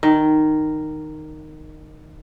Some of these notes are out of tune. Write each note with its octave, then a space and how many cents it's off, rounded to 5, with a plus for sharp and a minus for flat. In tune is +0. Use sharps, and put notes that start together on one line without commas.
D#3 -10